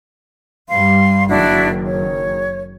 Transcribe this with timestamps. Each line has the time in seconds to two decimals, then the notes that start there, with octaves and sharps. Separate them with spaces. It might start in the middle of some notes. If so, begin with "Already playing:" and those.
0.69 G2 G3 F5 C6
1.28 F#1 D#3 D4 E4 F#4
1.85 C#5